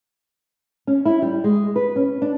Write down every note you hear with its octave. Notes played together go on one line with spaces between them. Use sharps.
C#4
E4
G3
G#3
B4
C#4
D4